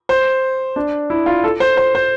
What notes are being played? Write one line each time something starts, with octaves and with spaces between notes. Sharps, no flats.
C5
D4
E4
F4
A4
C5
C5
C5